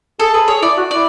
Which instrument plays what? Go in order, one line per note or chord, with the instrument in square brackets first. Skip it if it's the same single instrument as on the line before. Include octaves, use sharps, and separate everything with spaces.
[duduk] G#4 [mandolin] A4
[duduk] G#4 [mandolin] B4
[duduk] G#4 [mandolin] C#5
[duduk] E4 [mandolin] D5
[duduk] F#4
[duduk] E4 [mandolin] D5